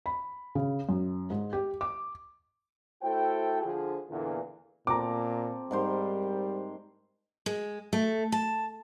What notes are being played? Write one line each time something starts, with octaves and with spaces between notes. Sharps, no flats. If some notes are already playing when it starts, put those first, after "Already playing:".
B5
C#3
F#2
G#2
G4
D6
A3 E4 F#4 A4 C5 G5
D3 F3 F4 G#4
E2 A#2 D3 E3
A#2 C4 A4 A#5 D6
G#2 G3 A#4 C5
G#3
A3
A5